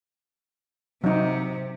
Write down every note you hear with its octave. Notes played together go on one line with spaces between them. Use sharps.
C3 F#3 D#4